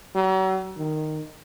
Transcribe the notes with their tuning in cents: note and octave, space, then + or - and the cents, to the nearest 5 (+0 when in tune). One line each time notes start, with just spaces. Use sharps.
F#3 +40
D#3 -10